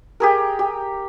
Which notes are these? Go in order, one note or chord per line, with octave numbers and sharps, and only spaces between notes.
G4 G#4 A#4
G4